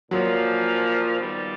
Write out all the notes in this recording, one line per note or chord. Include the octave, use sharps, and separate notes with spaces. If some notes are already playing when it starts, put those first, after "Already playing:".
A#2 F3 F#3 A#3
D#3 G3 B3